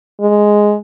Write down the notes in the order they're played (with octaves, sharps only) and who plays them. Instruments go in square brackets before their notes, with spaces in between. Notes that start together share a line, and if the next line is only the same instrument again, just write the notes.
[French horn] G#3